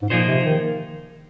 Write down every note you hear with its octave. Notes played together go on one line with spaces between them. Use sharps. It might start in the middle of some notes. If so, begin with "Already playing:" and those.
G#2
A#2 F3 A#3 D#4 G#4 C5
C3
D#3